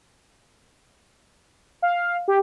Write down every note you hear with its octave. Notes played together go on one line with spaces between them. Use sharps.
F5
G4